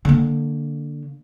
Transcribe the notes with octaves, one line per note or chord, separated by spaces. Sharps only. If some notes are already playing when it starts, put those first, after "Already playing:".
D3 A#3